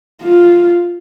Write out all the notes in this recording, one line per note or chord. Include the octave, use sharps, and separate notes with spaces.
F4